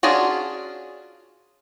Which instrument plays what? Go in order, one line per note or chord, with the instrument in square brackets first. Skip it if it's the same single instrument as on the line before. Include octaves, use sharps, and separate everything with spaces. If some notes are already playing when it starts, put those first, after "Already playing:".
[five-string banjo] C#4 D4 F4 F#4 G#4